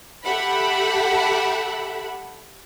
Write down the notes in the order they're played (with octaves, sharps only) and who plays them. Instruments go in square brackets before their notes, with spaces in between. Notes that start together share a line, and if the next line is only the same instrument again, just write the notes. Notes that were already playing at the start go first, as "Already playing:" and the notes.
[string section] G4 A4 E5 F#5 B5